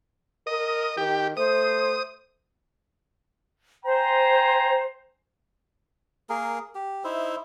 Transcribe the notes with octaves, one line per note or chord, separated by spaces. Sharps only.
A#4 D#5
D#3 G4
A3 C5 D#6
C5 G5 G#5 A#5
A#3 G#4 A#4
G4
D#4 E4 C5 E5